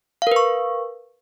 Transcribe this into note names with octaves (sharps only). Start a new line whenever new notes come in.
A#4 B4 F5 C#6